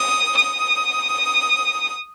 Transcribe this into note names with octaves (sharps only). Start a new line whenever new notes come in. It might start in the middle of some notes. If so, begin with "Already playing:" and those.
Already playing: D#6
D#6